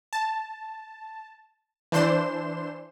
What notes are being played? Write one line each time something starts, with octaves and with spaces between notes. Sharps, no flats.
A5
E3 D4 C5 C6 E7